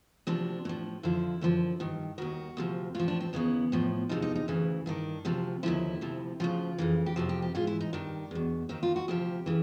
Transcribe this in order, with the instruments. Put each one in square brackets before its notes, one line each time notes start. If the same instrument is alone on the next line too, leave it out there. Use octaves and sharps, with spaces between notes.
[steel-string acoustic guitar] D2 C3 F3 D4
A2 F3
F2 D3 F3 E4
F#2 D3 F3
G2 D#3
D#2 D#3 F#4
D2 C3 F3
A2 F4
F3
D4
C4
D#2 C#3 E3 B3
A2 F3
E2 C3 F3 D#4
D#4
D#4
D2 C#3 E3
G2 D#3 D4
D2 C3 F3
D#2 D3 F3 E4
D2 C3 F3
D2 C#3 F3 F4
F2 C#3 E3
G4
F2 C3 F3 F#4
G4
G4
G#2 E3 F4
E4
D#4
G2 D#3 D4
E2 B2
D#2 D#3 C4
F4
F#4
D2 C3 F3 G4
C#3 E3